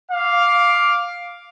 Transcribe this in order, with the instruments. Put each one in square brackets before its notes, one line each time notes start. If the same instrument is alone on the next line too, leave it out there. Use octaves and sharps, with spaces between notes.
[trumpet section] F5 D6